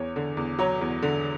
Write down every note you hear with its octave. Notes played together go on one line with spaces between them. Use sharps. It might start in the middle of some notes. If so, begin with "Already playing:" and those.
Already playing: E2 C#5
D3
E2
F#3 C#5
E2
D3